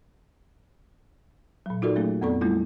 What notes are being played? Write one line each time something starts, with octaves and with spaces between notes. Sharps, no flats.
A#2 F#3
D#4 F4 F#4 A4 A#4 D5
F#3 A3 A#3 C#4 G#4
F2 B3 C4 A4 D5 C#6
G3 A3 A#3 C#4 E4 F4